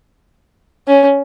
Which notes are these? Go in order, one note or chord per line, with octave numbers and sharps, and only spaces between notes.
C#4